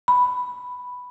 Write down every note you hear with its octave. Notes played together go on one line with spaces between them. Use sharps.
B5